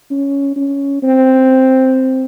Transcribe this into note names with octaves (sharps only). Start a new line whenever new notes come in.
C#4
C#4
C4